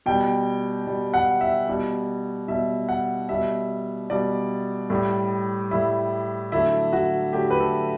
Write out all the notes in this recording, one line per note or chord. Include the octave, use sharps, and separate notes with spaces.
B2 G3 G5
B2 G3
F#5
E5
B2 G3
B2 G3 E5
F#5
B2 G3 E5
B2 G3 D5
A2 G3
A2 G3 E4
D3 F#3 A3 E4
F#4
D3 F#3 A3 G4
B4
A4